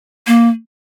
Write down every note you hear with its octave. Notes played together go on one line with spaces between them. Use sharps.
A#3